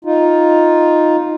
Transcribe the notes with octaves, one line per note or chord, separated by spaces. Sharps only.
D#4 F4